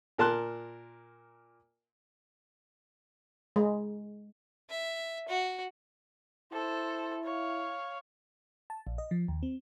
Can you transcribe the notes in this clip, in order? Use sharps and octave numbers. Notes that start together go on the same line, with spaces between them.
A#2 A#4 A5 C6 F#6
G#3
E5
F#4
E4 A4 C5
C#5 F5
A5
A#1
D#5
F3
D#2
C4